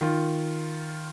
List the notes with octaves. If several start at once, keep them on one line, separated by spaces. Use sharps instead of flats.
D#3 F4